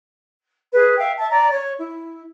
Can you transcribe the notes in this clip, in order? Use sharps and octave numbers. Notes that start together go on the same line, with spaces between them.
G#4 B4
E5 F5 G5
E5 A5
D5 A#5
C#5
E4